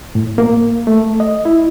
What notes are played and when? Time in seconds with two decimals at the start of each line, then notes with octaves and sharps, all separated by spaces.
0.15 A2
0.38 A#3
0.87 A3
1.20 D#5
1.45 E4